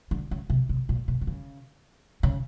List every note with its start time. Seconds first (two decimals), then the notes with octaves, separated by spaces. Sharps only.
0.11 D3
0.31 C#3
0.50 C3
0.69 C3
0.89 A#2
1.08 B2
1.21 D3
1.27 C#3
2.23 C#3